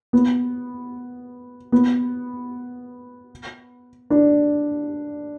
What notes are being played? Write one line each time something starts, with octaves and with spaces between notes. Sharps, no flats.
B3
B3
D4